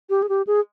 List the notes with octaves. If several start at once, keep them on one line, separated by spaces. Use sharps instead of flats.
G4
G#4
G4
G#4